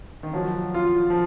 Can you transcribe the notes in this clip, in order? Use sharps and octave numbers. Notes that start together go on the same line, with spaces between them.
D#3
F3 F#3
F4
F3